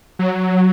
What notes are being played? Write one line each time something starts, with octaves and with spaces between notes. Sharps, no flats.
F#3